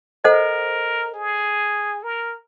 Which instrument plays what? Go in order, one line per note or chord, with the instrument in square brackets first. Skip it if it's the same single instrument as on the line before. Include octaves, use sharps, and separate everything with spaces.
[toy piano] A4 C5 D#5 F#5 [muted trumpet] A#4
[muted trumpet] G#4
A#4